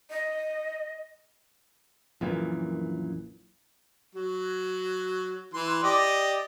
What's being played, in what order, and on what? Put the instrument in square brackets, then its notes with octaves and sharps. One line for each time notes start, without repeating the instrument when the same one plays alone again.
[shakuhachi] D#5
[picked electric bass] A#1 F#2 A#2 E3
[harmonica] F#3
E3 C6
G4 D5 D#5